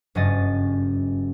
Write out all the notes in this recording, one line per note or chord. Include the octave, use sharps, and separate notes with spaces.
F#1 G2 F#3 C#4 D#5 A6